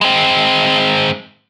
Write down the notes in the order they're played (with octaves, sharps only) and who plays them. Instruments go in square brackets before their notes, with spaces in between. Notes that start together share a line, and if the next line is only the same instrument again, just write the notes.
[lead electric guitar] G#3 C4